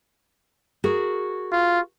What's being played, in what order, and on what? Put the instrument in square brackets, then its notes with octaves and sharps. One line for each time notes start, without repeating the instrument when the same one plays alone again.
[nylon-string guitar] F#4 G#4 A#4
[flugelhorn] F4